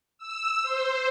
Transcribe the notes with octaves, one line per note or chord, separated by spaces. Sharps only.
E6
C5